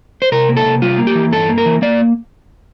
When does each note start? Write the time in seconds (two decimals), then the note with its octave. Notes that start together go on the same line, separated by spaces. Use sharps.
0.22 C5
0.32 C3 A#4
0.49 A#3
0.57 A4
0.65 C3
0.82 G3 F4
0.98 A#3
1.07 G4
1.15 E3
1.32 G2 A4
1.49 A#3
1.58 A#4
1.66 E3
1.82 A#3 D5